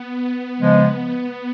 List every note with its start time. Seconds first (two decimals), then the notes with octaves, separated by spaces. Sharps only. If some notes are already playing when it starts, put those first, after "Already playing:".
Already playing: B3
0.59 C#3 F3 G#3